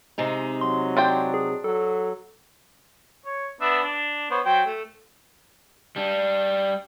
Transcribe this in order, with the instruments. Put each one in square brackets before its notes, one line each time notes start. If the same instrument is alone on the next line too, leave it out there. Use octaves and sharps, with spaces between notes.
[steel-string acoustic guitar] C3 G#3 D#4
[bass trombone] F#3 [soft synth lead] C6
[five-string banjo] D4 C5 G5
[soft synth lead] G#4
[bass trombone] F#3 [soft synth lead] A4
[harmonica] C#5
B3 D4 E5
D4
B3 C5 C#5
F#3 C5 G5
A3
[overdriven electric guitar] G3 D4